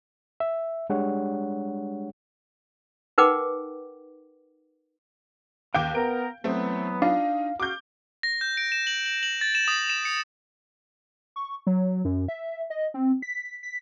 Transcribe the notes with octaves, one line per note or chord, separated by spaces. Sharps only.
E5
G3 G#3 D4 G4 C#5 F#5
D#4 A#4 B4 F#5 G5 D6
D#2 F5 G5 D6 G6
B3 A#4 D7
E3 F#3 A3 B3 C4
D4 D#4 F4 F5
F#4 F5 D6 G6
A#6
G6
D7
E7
F#7
F#7
F#7
A6
E7
D#6
E7
C#7
C#6
F#3
F#2
E5
D#5
C4
B6
B6